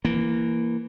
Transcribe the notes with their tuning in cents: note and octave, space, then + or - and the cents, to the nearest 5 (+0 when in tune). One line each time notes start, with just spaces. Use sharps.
E3 +15 A#3 +0